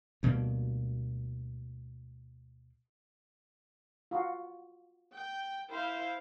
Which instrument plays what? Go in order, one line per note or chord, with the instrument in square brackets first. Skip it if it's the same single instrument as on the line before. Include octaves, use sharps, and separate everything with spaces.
[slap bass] D2 B2 G3 A#3
[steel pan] F4 F#4
[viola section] G5
E4 C5 F5